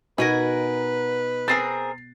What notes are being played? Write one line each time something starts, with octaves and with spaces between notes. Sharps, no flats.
B2 D#4 A#4 B4 F#5 G#5
C4 G#4 A#4 A6 C7